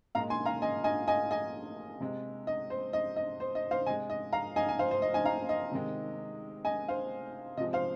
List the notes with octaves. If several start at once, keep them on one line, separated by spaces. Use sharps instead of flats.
A#2 G#3 F5 A#5
G#5 C6
F5 A#5
D#5 G#5
D#5 G#5
D#5 G#5
D#5 G#5
C3 G#3
D#5
C5
D#5
D#5
C5
D#5
C5 F5
C3 G#3 D#5 G#5
D#5
F5 A#5
D#5 G#5
G#5
C5 F5
C5
D#5
D#5 G#5
F5 A#5
D#5
C3 D#3 G#3
D#5 G#5
C5 F5
C3 F3 G#3 D#5
C5 F5